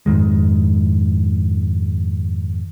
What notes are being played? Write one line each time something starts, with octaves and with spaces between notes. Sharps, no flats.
F2 G#2 D#3 G#3